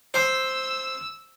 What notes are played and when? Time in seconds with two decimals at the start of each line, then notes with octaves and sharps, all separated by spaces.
0.14 C5 E6